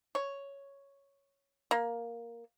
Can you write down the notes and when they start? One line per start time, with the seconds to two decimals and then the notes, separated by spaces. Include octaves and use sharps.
0.15 C#5
1.71 A#3